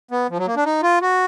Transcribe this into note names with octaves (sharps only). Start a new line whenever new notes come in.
B3
F3
F#3
A#3
D4
D#4
F4
F#4